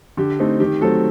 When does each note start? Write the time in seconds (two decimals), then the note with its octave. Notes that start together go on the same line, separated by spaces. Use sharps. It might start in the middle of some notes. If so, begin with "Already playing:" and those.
0.17 D3 G4
0.39 A3 C4 D#4
0.60 D#3 G4
0.81 F#3 A3 C4 A4